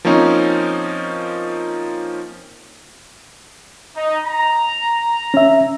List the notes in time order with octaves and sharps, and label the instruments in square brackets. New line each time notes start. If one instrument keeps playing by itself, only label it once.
[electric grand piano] F3 A#3 C4 C#4 D#4
[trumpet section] D#4
A#5
[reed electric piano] C#4 E5